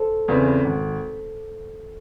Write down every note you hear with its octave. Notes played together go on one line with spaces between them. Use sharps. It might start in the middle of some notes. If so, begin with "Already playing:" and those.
Already playing: A4 C5
E2 C#3 E3 C4
G#1